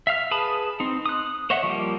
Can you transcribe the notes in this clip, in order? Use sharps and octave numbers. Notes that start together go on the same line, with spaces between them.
E5 F5 F6
G#4 B4 A5 B5 D#6
C4 D#4
D#6 F#6
C5 C#5 D#5 E5 F#5
F3 G3 A#3